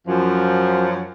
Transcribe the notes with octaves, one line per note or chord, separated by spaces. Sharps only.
F#2 F3